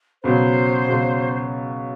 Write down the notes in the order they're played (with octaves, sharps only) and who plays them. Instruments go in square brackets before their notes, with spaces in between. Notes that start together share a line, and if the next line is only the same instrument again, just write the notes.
[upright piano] C#2 B2 F#3 [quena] C5
[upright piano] C#2 B2 F#3